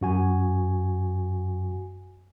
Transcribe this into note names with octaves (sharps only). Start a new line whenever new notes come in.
F#2 F#4 G#5